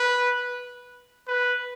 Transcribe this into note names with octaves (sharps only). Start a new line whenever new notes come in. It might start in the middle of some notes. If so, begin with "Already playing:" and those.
Already playing: B4
B4